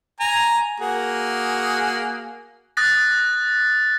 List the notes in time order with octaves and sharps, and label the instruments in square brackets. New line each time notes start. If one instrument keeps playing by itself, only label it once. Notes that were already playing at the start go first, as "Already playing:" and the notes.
[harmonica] G#5 A#5
A#3 F#4 G#4
[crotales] D#6 F#6 A6 A#6